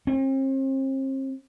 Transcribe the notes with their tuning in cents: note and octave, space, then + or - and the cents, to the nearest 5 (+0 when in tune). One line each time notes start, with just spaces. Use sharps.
C4 +40